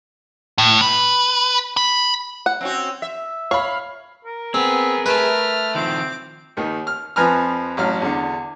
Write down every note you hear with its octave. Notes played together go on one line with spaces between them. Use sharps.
A2
B4
B5
F#5
C4 C#4 F#4
E5
C#5 F5 B5
A#4
B3 C4 G#4
A3 B4 F6
D#3 F3 C4 D6
D#2 D#3
F6
F2 F3 B4 G#5 A#5 F6
A1 F#3 F6
E2 D3